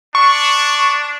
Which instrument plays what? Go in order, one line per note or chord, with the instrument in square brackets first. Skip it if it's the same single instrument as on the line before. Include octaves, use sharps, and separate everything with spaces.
[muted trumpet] D4 [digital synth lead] C#6